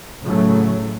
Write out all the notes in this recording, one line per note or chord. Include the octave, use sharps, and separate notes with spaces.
A2 C#3 F#3 A3